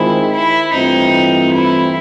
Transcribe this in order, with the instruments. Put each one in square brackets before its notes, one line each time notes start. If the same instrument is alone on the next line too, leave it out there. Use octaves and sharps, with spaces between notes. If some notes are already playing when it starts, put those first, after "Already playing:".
Already playing: [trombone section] D#3 G#3 C4 F4 G#4 [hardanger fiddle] E4
[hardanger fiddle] E4
[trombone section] G2 E3 A3 C4 F4 [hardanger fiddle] D#4
[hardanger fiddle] E4